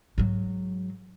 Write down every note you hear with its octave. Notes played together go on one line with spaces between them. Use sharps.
G#2 F#3